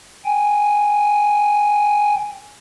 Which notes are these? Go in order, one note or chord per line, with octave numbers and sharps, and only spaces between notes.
G5 G#5